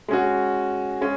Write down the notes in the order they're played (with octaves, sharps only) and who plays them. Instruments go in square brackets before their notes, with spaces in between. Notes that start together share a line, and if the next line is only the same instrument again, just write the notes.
[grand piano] G#3 C#4 F#4
G#3 C#4